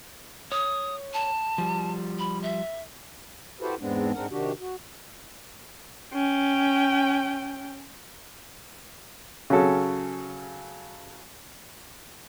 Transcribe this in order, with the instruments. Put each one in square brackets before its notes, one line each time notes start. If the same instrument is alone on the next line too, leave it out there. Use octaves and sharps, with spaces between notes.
[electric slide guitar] C#5 [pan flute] D#6
[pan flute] A5
[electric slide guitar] F3 G3
[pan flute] B5
E5
[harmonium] E4 F#4 G4 A4 B4 C5
E2 G#2 G#3 B3 C4 D4
G#2 G#3 C4 D4 A#4 F#5
C3 D#3 D4 F#4 G4
F#4
[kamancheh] C#4 G5
[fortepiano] C#3 F#3 C#4 F#4 A4